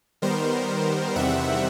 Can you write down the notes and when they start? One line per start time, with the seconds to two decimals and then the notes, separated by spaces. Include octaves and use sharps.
0.22 D#3 G3 B3 A#4 C5
1.15 E2 C3 D#3 G3 C4 E5 F#5